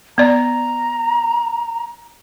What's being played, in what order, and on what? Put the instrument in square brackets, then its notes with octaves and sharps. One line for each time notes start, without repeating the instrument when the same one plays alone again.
[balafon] B3 D5 [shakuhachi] A#5